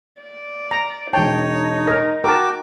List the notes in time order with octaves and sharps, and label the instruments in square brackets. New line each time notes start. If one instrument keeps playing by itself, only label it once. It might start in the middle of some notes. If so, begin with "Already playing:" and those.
[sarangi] D5
[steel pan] A#5
[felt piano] E1 A5 [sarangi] D#4 [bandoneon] C#5 [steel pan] G5
[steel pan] A#4 D#5 [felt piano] A#6
[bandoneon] F#4 G5 D6 [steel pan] A#4 A5 [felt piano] A#5